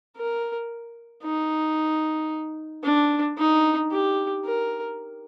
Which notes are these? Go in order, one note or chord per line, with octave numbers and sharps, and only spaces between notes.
A#4
D#4
D4
D#4
G4
A#4